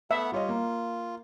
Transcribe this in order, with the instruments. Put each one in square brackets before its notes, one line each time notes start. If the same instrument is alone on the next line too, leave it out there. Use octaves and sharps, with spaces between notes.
[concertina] A3 B3 F#5 [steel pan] E5
[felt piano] G3 C#5 D#5 [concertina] F4
[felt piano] A#3